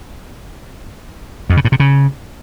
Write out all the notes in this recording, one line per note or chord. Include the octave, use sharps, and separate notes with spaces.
F2
C#3
A2
C3
C#3